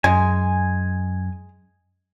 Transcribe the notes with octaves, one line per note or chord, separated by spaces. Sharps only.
F#2 G#3 G#5